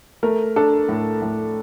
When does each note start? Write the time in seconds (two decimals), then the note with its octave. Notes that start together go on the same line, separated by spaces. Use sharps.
0.23 A3 A#4
0.56 D4 A4
0.89 A2
1.22 A2